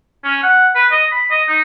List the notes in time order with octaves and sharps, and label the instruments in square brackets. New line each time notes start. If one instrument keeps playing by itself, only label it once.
[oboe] C#4
F#5
B4
D#5
B5
D#5
D#4